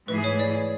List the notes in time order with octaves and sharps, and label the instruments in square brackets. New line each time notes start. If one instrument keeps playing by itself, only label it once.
[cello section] G#2 E3 A3 E4 G#4 [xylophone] B4
[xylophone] C#5
D5